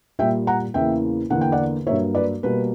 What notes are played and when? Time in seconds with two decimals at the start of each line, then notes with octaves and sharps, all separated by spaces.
0.19 A#2 G3 A#3 E5 G5
0.47 F#5 A#5
0.74 E2 C#3 E3 A#3 E5 G5
1.30 E2 D3 A#3 F#5
1.41 G5
1.52 D5 F#5
1.87 G2 F#3 A#3 C#5 E5
2.15 B4 D5
2.43 B2 G3 A#3 B4